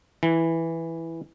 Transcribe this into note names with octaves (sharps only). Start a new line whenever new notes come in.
E3